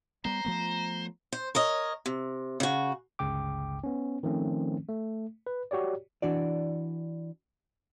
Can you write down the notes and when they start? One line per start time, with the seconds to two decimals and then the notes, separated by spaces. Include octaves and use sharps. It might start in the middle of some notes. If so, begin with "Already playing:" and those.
0.25 G3 B3 C5 A#5
0.45 F3 A3 B3
1.33 C5
1.55 A#4 C#5 D#5
2.06 C3
2.60 C#3 F#4
3.19 G1 C#2 C#3 G5 D6
3.84 B3 C#4
4.23 D#3 F3 A3 C4 C#4
4.89 A3
5.47 B4
5.71 F#4 G4 C#5 D5
6.22 E3 D4 F#4 D5